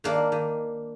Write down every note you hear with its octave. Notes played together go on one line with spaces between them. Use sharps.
D#3 A#3 D4
D#3